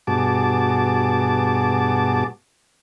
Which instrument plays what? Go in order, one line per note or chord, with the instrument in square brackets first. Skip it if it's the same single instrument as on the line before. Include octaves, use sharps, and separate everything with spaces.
[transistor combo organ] G2 B2 F#4 G#4 A5 D6